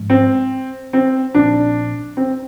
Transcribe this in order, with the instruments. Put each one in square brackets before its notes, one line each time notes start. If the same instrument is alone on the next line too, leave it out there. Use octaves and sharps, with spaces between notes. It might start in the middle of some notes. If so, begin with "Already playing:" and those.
Already playing: [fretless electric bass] G#2 F3 G#3
[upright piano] C4
C4
[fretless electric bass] A#1 A#2 F3 C4 [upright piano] D4
[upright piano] C4